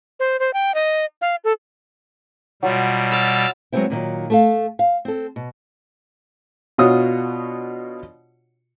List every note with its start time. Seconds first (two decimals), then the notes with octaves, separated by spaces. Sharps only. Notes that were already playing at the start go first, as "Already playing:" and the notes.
0.20 C5
0.40 C5
0.54 G5
0.75 D#5
1.21 F5
1.44 A4
2.63 B2 F#3 G3 F4 C6
3.12 B4 E6 F6 A6
3.72 F#3 G#3 A3 B3 C4 E4
3.90 A#2 D#3 E3 F#3
4.30 A3 A4 F5
4.79 F5
5.05 C4 A4
5.36 B2
6.78 B2 D4 F4 F#4 C#5 D#6